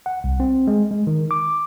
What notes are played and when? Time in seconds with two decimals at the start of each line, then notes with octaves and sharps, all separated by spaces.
0.06 F#5
0.24 C2
0.40 C4
0.67 G#3
0.91 G#3
1.07 D#3
1.31 D6